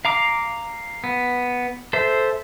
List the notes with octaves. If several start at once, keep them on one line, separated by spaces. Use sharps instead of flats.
F5 A#5 D6
B3
A4 C5 E5